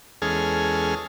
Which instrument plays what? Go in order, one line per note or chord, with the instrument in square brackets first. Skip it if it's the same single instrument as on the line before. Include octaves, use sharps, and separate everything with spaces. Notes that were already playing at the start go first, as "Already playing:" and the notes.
[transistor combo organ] E2 G#3 C#4 G#4 A4 F6